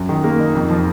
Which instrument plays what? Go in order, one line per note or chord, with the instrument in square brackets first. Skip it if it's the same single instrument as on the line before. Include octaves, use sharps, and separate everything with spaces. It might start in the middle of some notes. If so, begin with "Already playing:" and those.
Already playing: [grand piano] F#2
D#3
A#3
D#4
F2
F3